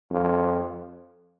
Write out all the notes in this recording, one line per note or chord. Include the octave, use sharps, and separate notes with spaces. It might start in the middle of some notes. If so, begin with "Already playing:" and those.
F2